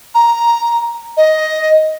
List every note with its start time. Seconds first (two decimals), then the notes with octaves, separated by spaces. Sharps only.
0.15 A#5
1.17 D#5